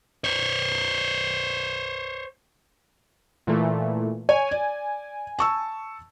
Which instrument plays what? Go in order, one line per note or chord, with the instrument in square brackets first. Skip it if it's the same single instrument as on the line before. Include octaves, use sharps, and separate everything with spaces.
[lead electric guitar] C5 C#5
[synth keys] A#2 E3 A3
[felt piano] C#5 [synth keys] G#5
[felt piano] D5
A5 C#6 E6